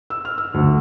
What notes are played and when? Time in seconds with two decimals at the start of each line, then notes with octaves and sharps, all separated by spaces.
0.10 E6
0.25 F6
0.38 E6
0.54 D2